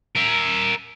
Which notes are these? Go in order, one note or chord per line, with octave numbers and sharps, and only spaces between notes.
A#4 E5